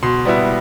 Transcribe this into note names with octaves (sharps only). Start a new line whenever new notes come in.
B2 C6
G3 B3 E4